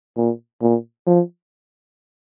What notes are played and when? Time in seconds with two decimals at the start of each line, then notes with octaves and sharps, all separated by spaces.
0.17 A#2
0.62 A#2
1.07 F3